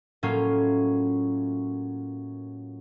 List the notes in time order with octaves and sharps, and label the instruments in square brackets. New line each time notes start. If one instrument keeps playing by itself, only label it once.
[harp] A2 F#3 A#3 C#4 F4